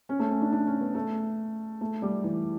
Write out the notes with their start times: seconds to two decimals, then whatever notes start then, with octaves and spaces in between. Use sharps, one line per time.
0.09 C#4
0.19 A3
0.31 C#4
0.41 D4
0.52 D4
0.67 C#4
0.81 B3
0.94 A3
1.81 A3
2.02 G3
2.24 E3